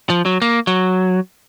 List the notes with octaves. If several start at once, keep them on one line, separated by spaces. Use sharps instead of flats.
F3
F#3
A#3
F#3